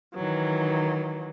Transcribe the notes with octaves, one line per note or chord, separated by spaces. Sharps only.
D#3 E3 F#3